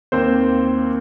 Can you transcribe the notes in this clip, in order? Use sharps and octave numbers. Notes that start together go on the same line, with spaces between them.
D#2 D#3 A#3 C4 C5